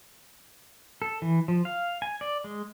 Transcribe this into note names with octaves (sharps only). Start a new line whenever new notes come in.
A4
E3
F3
F5
G#5
D5
G#3